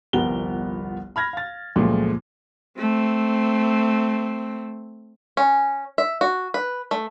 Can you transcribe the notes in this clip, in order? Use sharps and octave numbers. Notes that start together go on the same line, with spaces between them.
G1 C2 F3 B3 A#4 G7
B5 F6 G#6 A#6
F5 A6
C#2 F#2 A#2 F3 G#3 A3
A3 C4
C#4
E5
F#4
B4
A3